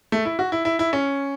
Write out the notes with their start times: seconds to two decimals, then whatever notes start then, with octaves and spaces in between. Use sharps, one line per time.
0.12 A3
0.25 E4
0.39 F#4
0.52 E4
0.65 E4
0.79 E4
0.93 C#4